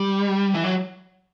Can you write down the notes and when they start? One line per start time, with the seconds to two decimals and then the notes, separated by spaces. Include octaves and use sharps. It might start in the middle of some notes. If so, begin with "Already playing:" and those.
Already playing: G3
0.54 E3
0.64 F#3